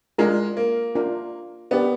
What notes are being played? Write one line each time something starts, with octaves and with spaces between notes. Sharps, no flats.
G#3 D4 F4 A#4
A#3
D4 F4 A#4
B3 D4 G4 A#4 D5